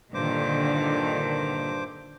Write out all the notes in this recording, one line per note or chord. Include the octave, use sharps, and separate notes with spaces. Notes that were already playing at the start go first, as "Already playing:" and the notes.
G2 A#2 D3 D#3 C5 D6